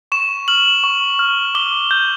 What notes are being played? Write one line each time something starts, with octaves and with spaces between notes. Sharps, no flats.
C#6 E7
F6 F#7
C#6
F6
D6 G7
G6